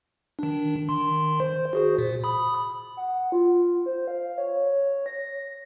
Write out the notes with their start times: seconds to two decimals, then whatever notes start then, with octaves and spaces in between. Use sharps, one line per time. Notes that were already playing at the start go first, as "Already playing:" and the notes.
0.39 D#3 D4
0.89 D#3 C6
1.40 C5
1.73 F#4 G#4 C5
1.98 A#2
2.24 B5 D#6
2.97 F#5
3.32 F4
3.86 C5
4.08 F5
4.38 C#5
5.06 A#6